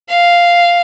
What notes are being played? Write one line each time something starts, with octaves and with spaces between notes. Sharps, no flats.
F5